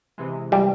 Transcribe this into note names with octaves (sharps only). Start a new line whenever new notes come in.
C3 E3 G#3
G3